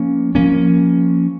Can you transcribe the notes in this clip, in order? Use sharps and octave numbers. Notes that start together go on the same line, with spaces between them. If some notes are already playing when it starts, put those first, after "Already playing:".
Already playing: F3 A#3 C#4
F3 A#3 C#4